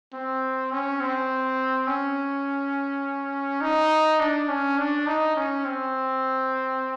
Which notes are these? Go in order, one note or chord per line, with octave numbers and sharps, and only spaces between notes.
C4
C#4
C4
C#4
D#4
D4
C#4
D4
D#4
C#4
C4